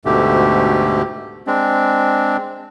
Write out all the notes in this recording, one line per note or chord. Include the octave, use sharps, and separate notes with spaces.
D2 G#2 B2 D3 A3 G4
G#3 C4 D4